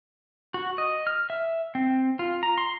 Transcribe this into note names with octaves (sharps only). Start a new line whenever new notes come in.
F#4
D#5
F6
E5
C4
F4
A#5
C6